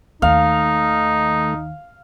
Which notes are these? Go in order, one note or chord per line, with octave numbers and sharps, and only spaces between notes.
D#2 D#3 A3 D#4 F5